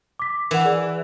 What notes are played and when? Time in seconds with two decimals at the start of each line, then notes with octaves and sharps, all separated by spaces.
0.19 D6 B6
0.51 E3 A#4 F#5
0.65 G#4 D5